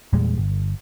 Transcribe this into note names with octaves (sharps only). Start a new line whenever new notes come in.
E2 A#2 G3 G#3
G1